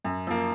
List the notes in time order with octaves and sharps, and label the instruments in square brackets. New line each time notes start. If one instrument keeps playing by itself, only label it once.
[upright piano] F#2
F3 A#3